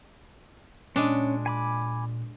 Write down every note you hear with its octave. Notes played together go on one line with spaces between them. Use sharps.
A#2 G#3 C#4 D4
G#5 B5 D6